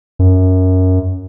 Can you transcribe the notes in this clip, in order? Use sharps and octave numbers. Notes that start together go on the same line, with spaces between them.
F#2